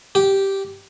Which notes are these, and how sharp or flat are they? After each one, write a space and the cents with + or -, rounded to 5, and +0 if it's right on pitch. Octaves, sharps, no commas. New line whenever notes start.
G4 -5